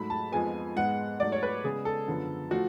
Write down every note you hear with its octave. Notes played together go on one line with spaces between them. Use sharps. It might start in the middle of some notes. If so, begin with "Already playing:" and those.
Already playing: G#2 F#3 A3 B5
A5
F2 F3 G#3 B3 G#5
G#2 G#3 B3 F#5
G#2 F#3 A3 D5
C#5
B4
C#3 G#3 B3 G#4
A4
F#2 D3 F3 B3
F3 A3 F#4